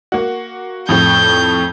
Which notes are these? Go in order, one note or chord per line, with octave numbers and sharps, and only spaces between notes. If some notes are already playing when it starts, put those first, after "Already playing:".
A#3 F#4
F2 A2 G6